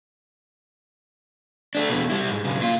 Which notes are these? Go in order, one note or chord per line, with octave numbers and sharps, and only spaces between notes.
A3 D4
E2 B2
G3 E4
G#2
B1 C#3
A#2 F4